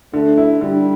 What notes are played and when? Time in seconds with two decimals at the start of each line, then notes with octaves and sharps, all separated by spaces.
0.13 D3 A3
0.38 E4
0.61 D3 G3